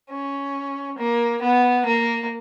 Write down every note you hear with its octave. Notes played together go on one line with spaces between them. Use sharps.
C#4
A#3
B3
A#3